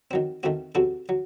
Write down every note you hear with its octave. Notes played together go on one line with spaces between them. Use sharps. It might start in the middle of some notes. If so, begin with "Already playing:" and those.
D#3 F#3 C4
D#3 A3 C4 F#4
C3 F#3 C4 F#4 A4
F#3